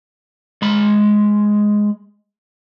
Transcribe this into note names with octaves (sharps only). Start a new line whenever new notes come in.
G#3 B5